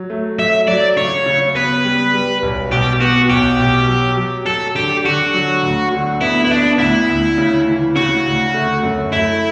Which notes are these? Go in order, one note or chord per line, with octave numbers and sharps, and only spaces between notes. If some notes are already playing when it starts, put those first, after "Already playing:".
Already playing: F#3
A3
F#3 E5
F#3 D5
C#3 C#5
C#3
B3 B4
G3
G3
B1
B2 G4
B3 F#4
B1 G4
B2
F#3
F#3
F#3 A4
D3 G4
D3 F#4
F#3
D2
D3
B3 E4
E4
B3 D4
D2 E4
D2
C#3
E3
C#3 F#4
D2
A3
F#2
A3 E4